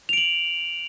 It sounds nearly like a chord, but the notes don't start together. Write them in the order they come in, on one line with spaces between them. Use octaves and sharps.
F7 D7 F#7